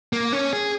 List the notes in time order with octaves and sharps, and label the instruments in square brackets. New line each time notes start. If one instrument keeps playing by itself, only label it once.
[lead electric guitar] A#3
C#4
G#4